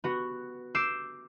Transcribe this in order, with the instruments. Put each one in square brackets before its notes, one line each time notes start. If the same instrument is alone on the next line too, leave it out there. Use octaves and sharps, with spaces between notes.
[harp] B3 F#4
D6 E6 G6 C7 D7 E7